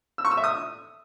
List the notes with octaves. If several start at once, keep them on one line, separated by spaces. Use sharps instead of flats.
E6
C#6
E6
E5
D#6